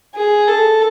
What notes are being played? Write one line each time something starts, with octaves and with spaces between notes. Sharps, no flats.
G#4
A4